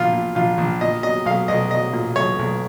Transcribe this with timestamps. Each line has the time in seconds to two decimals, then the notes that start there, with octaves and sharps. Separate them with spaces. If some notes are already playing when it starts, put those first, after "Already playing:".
Already playing: A#1 A#2 F4
0.13 A#2
0.35 A#1 F4
0.58 A#1
0.81 A#2 D#5
1.03 F#3 D#5
1.25 B1 F5
1.48 B1 D#5
1.71 F#3 D#5
1.93 A#2
2.16 B1 C#5
2.39 B1